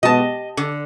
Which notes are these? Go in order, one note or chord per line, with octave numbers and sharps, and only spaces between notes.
B2 G#3 B3 D#5 A5
G4
D3